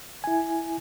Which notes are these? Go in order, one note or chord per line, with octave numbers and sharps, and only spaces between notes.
E4 G#5